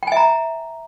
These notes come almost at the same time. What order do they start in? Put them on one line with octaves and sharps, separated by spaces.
G5 G#5 E5 A#5